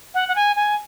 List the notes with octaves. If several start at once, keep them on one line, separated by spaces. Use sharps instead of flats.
F#5
F#5
G#5
G#5